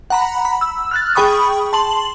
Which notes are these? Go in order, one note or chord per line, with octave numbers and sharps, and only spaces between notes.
F#5 A#5 B5
B5
E6
F6 F#6 A6
G#4 G5 B5 C#6 D#6
A5 C6 F#7